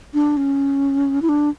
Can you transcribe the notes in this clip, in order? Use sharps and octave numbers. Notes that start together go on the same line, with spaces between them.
D4
C#4
E4
D4